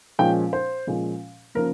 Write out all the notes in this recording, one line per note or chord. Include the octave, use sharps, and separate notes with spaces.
A#2 F3 G#3 C#4 G5
C5
A#2 F3 G#3 C#4
C#3 F3 A#3 A#4